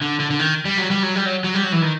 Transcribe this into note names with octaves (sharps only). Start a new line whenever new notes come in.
D3
D3
D3
D#3
G3
F#3
G3
F#3
G3
F#3
F#3
G3
F#3
E3
D#3